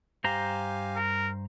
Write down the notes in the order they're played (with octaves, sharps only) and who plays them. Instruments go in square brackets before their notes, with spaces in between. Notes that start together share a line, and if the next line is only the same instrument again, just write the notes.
[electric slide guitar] G2 C5 A#5 [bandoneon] G4 F5 G#5
[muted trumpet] A#4